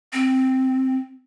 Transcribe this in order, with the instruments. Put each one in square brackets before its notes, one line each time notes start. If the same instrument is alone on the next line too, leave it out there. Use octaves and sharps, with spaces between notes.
[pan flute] C4